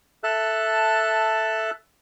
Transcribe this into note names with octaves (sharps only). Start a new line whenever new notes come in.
A4 E5 A5 F#6